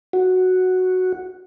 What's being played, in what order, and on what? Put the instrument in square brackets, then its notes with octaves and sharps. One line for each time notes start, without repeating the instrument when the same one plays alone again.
[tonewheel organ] F#4